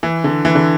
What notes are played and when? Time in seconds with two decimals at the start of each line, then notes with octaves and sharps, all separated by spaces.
0.03 E3
0.24 D3
0.45 E3
0.55 D3